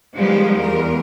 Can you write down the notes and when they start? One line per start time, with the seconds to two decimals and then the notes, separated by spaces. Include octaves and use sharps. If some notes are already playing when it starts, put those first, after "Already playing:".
0.19 D#3 F3 G3 G#3 B3
0.58 E2 A#4